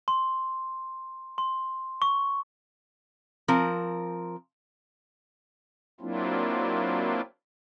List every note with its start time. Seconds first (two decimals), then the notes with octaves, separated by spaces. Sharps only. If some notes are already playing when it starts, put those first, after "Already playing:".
0.08 C6
1.38 C6
2.02 C#6
3.48 F3 C4 A#4
6.01 F#3 A#3 C4 D4 E4 F4